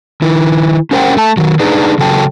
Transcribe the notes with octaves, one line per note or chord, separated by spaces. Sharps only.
D#3 E4
C#4 G4 A#4 C5 F#5 G5
A3 A5
D#3 F#3
D4 D#4 G#4 B4
C#3 F#3 A4 G5 A5